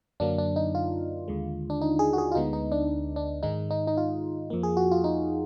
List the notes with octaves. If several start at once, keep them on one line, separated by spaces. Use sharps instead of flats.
F#2 D3 F#3 A#3 D4
D4
D#4
F4
D#2 D3 G#3
D4
D#4
G#4
F#4
G#4
F4
D2 D3 G#3 B3 D#4
D#4
D4
D4
G#2 D#3 G#3 D#4
D#4
D#4
F4
F2 F3 A#3
G#4
F#4
F4
D#4